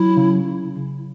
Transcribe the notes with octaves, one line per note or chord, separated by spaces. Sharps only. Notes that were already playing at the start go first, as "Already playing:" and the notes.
Already playing: F#3 E4
C#3